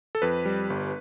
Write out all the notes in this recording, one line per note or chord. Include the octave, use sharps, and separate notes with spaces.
A4
F2 B4
G3
G1